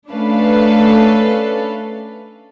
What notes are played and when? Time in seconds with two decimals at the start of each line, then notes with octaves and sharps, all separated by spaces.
0.10 A3 C#4 D4 A4 B4 F5